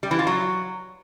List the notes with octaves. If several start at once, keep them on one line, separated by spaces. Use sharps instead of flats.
G3
E3
F4
F#3